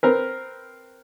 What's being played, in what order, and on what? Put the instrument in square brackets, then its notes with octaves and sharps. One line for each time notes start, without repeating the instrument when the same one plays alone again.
[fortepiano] C4 A#4 B4